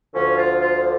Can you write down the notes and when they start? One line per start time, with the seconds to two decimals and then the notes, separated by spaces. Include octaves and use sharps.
0.13 D2 D3 F3 C#4
0.37 F4
0.60 F4